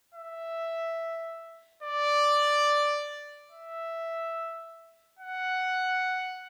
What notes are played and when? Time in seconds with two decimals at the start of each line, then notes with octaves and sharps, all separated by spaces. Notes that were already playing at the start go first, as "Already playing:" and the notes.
0.14 E5
1.83 D5
3.51 E5
5.19 F#5